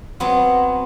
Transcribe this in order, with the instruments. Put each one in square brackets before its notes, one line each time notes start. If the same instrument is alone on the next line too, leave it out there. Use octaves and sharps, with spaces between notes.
[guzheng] F#3 B3 C4